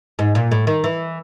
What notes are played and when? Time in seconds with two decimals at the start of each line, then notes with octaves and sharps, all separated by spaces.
0.19 G#2
0.35 A#2
0.51 A2
0.67 D#3
0.84 E3